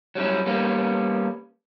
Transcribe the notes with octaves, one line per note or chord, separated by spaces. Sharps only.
F#3 G3 C#4 E4
G3 A#3 B3 C#4